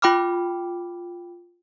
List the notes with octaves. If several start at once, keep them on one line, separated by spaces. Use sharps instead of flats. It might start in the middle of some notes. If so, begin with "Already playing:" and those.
F4 G5 B5 D6 F6